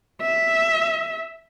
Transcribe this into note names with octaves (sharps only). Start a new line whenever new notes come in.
E5